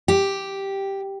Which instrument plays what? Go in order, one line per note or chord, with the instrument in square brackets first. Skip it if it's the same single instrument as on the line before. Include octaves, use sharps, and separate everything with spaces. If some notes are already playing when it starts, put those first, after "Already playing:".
[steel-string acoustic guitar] G4